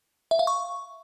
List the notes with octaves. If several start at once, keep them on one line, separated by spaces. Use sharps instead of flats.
E5
F5
C#6